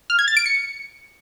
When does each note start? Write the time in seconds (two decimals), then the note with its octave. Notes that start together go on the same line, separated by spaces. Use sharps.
0.10 F6
0.19 G#6
0.28 A6
0.37 D7
0.46 C#7